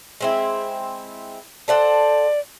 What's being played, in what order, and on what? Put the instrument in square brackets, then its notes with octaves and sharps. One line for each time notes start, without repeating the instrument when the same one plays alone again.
[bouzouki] G#3 C4 E4
[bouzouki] A4 C5 F#5 [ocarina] D5